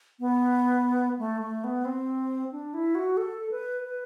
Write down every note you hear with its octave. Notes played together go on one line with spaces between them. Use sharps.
B3
A3
A3
B3
C4
D4
E4
F#4
A4
B4
B4